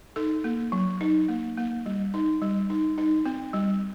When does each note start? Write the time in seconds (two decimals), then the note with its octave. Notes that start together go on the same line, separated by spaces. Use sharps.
0.16 D#4 A4
0.44 A#3
0.72 F#3
1.01 D#4
1.28 A#3
1.57 A#3
1.86 G3
2.14 D#4
2.42 G3
2.70 D#4
2.98 D#4
3.25 C4
3.53 G3